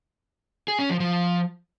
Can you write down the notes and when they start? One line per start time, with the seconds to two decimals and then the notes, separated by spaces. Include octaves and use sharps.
0.68 G#4
0.79 C#4
0.89 F3
1.00 F3